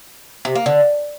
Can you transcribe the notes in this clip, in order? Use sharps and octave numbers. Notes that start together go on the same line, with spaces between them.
C3
A#3
D3